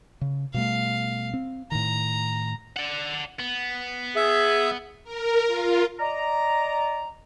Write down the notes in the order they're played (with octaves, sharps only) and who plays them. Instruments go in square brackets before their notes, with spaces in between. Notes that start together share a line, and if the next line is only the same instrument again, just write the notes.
[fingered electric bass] C#3
[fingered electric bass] B2 G3 A3 [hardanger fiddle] F5
[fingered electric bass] C4
[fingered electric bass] A2 D#3 [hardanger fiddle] A#5
[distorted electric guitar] D5 F#5
B3
[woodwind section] G#4 [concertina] E5
[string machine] A#4
F4
[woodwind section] D5 D#5 A#5